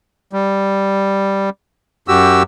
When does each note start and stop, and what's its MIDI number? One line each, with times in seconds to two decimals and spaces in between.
0.33 1.50 55
2.08 2.43 42
2.08 2.43 66
2.08 2.43 67
2.08 2.43 88